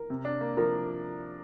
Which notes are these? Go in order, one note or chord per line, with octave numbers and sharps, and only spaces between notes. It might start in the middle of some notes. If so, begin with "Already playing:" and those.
Already playing: A#4
C3
D4
A#3
F3 A#4